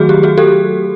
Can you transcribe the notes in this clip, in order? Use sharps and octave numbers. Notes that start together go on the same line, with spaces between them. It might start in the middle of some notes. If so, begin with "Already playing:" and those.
Already playing: D#3 F#3 A3 F#4 G#4
G4
F#4 G#4
G4 A4